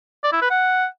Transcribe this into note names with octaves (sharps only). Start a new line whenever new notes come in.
D5
E4
B4
F#5